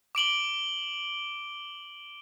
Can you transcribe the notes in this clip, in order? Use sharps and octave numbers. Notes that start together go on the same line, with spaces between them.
D6 D7 F#7 G7